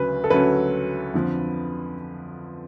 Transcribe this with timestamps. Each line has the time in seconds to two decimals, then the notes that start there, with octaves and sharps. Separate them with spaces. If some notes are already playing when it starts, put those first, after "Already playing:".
Already playing: D2 C#3 F#3 C#4 B4
0.24 A4
0.30 D2 C#3 F#3 C#4 B4
1.14 F2 D3 F3